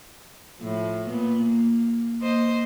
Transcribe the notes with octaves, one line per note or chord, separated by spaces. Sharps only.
A2 F3
A#2 B3
A#3
A#3 C5 D#5